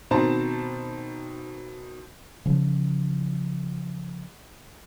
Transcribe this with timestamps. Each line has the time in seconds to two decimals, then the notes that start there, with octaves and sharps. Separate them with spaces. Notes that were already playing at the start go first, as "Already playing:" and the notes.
0.11 B2 D#3 C4 C5 A5 A#5
2.46 C#3 E3 F3